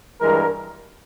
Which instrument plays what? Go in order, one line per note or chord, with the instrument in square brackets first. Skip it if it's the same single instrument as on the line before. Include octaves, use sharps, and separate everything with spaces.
[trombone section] G2 E3 G#3 A#4